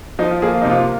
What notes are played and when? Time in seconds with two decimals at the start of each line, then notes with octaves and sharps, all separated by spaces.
0.19 F3 D#4
0.31 F4
0.42 A#3 G#4
0.54 F4
0.62 C3 D#4
0.70 F4